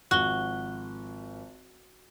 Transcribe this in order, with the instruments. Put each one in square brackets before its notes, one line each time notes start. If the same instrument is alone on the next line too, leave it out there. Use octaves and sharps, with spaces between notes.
[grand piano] G#1 F3 [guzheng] F#4 [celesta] F#6 G7